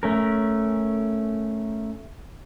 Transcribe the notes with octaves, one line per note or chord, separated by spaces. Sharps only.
A3 C#4 A#4